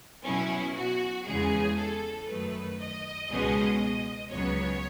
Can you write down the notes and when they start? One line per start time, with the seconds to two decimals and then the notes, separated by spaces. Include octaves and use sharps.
0.24 B2 F#3 C#4 E4
0.76 F#4
1.26 E2 C#3 E3 G#3 G#4
1.77 A4
2.28 F#2 D#3 F#3 A3 B4
2.79 D#5
3.29 C#2 B2 G#3 C#4
4.31 C#2 C#3 F#3 B3 C#5